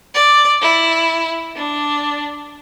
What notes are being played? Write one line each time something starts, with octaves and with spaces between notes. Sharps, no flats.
D5
E4
D4